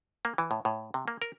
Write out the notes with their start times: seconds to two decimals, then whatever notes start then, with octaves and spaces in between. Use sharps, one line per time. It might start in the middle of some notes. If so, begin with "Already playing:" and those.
0.25 A#3
0.38 E3
0.51 A2
0.65 A2
0.94 C3
1.08 A#3
1.22 A#4